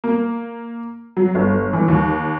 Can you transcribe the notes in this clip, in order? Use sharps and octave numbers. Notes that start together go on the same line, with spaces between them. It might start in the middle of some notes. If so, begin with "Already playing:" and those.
A#3
F#3
G1
E3
D#2